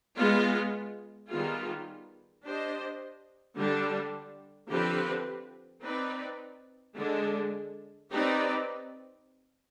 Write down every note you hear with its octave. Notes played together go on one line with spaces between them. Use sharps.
G#3 B3 F4
D#3 G3 B3 F4 G#4
D4 G4 C5 D#5
D3 G3 D4
D3 F3 C4 G4 B4
C4 D#4 B4 D5
D3 G#3 D4
C4 D#4 G4 B4 D5